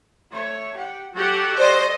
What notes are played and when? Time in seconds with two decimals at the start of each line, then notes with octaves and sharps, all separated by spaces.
0.32 A3 C#5
0.75 G4 F#5
1.14 F#3 F#4 G4 A4 F#5
1.57 C5 D5 D#5 C6